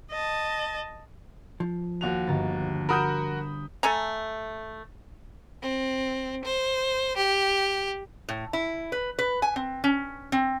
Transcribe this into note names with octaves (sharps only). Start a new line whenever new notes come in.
D#5 A5
F3
D#2 F#4 F7
G1 A#5 A6
F#4 A#4 B5 D#6 G6 D7 E7
A3 A4 G#5 A#5
C4
C5
G4
A2
E4
B4
B4
G#5
C4
C#4
C4